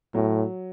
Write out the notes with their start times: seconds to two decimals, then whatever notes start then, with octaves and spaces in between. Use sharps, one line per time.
0.15 A2 F#3